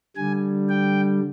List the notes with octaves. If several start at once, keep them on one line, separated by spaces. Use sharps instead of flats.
D3 G3 G#5
G5